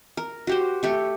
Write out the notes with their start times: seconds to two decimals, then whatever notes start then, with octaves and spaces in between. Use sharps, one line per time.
0.17 A#4
0.47 F#4 G4 C5
0.83 A3 G4 C#6